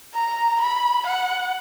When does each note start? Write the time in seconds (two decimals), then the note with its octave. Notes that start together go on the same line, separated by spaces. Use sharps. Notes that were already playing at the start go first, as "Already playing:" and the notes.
0.15 A#5
0.61 B5
1.07 F#5